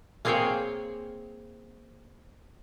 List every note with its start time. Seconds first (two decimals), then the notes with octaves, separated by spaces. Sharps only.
0.25 A#3 C4 G#4 C5 C#5 G5